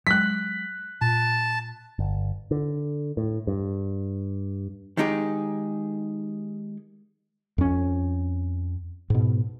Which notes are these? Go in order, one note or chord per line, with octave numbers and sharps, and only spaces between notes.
F#3 G#3 F#6 B6
A#2 A5
G1
D3
A2
G2
D#3 G#3 D#4 G4 G#4
F2 C#4
G#2 B2